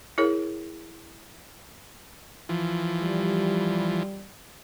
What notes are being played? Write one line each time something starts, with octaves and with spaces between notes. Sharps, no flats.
E4 G#4 A#4 C#5
E3 F3
G3